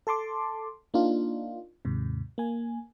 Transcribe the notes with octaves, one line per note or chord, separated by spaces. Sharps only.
A4 A5 C6 D6
A#3 D4 D#4 F4
D#2 G#2 C3
A#3 G#5